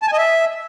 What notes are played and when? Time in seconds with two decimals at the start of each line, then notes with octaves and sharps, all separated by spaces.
0.02 A5
0.08 G#5
0.13 D#5
0.18 E5